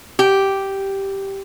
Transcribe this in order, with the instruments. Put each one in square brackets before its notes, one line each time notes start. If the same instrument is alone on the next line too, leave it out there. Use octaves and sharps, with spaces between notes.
[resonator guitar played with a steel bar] G4